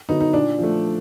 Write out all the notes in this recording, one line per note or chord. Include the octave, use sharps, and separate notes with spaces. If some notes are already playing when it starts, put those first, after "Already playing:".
D3 F#3 B3 D#4
D#4
A#2 D4
F3 A3